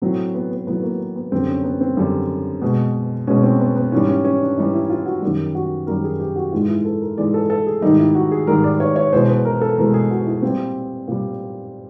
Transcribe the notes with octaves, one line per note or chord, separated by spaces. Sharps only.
A2 F#3 C4
B3
B3
A2 F#3 B3
A#3
B3
F#2 D3 G3 C4
C#4
B3
C4
F#2 D3 G3
B2 G#3
B2 G#3 C#4
C4
B3
B3
G#2 E3 G3 C#4
C#4
C#4
D4
G#2 E3 G3 D#4
E4
F4
F#4
F#2 D#3 G3 G4
F#4
F#2 D#3 G3 A#4
G#4
G4
F#4
G#2 E3 G#3 F4
E4
A4
A#4
G#2 E3 G#3 D5
A4
A4
G#4
G#2 D#3 G3 D#4
E4
F#4
G#4
G#2 D#3 G3 A#4
D5
C#5
C#5
E2 B2 G#3 C5
B4
A#4
A4
E2 B2 G#3 A#4
G#4
F#4
E4
A#2 G3 C4
A#2 G3